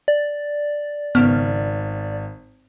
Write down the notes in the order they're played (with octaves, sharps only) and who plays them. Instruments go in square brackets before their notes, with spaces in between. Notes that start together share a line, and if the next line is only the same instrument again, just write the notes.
[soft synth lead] D5
[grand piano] G#1 [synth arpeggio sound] C#3 B3 F6